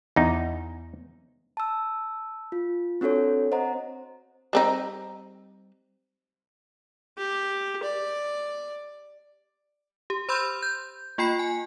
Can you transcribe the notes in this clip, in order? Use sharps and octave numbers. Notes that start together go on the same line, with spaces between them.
E2 D#4
A5 E6
F4
C4 D4 F#4 A4 C#5
C4 C5 D#5 F#5 A#5
G3 C4 D#4
G4
D5
G4
C5 B5 C6 E6 G6
G6
A#3 F4 G5 B5 C7
G#5